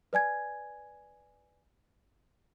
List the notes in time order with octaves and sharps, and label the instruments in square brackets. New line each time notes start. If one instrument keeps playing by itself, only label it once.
[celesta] B4 D5 G#5 G#6